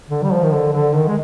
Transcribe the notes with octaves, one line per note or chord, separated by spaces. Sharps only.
D3
G3
F3
D#3
D3
D3
D#3
G#3